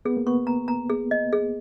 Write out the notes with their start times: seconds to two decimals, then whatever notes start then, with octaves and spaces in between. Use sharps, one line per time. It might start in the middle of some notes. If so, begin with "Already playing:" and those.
0.05 B3 G#4
0.17 A#3
0.27 B3 C#6
0.47 A#5
0.68 A#5
0.90 G#4
1.11 D#5
1.33 G#4